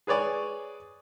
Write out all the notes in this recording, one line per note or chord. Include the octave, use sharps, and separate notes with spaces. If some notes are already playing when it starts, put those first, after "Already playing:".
G#4 B4 C#5 D5 G#5